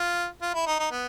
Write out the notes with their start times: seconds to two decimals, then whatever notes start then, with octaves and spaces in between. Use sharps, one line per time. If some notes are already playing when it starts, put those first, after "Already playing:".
Already playing: F4
0.41 F4
0.54 E4
0.66 D#4
0.79 D#4
0.91 B3